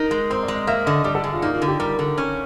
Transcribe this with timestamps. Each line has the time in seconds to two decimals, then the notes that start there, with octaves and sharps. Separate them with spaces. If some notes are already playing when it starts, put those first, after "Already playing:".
Already playing: D#4 A#4
0.11 G#3
0.30 C4 C5
0.43 D5
0.48 G#3
0.55 D#5
0.67 A#3 E5
0.86 D3 D#5
1.04 G3 D5
1.15 A4
1.24 D3 G#4
1.33 F4
1.42 A#3 D#4
1.55 F4
1.62 D3
1.68 G4
1.79 G3 A#4
1.99 D3
2.18 C#4